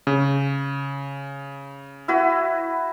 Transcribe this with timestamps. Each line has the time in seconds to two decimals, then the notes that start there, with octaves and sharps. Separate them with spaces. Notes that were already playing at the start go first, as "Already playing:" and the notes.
0.07 C#3
2.08 E4 F#4 B4